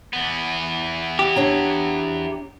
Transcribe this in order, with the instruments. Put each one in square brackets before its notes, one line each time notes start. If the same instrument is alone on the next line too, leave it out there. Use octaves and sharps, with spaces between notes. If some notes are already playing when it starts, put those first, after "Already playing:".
[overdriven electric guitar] E2 B3
[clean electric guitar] G4
[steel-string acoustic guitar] D4 C#5 A#5